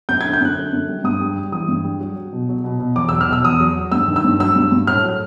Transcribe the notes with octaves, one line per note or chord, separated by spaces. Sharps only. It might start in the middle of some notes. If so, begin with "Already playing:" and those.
F#2 G6
G#6
D3
G6
F#2 F#6
D3
F#2
G3
G2 D#6
G3
G3
E3 D#6
G2
G3
F#3
F#3
B2
F#3
B2
B2
E2 D6
E6
F#3
F6
B2 E6
E2 D#6
F#3
F#3
G2 E6
D#3
E6
G2
F#3 E6
G2
G2
A2 F6
F#3